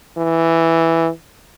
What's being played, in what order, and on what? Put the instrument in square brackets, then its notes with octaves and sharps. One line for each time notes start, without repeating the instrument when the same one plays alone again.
[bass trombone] E3